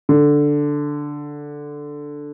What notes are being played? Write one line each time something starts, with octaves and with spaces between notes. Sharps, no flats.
D3